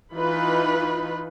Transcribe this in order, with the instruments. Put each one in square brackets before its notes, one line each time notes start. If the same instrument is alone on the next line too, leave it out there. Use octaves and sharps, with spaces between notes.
[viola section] E3 D#4 F4 B4 B5